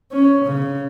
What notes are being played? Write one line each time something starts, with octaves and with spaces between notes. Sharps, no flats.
C#4
C#3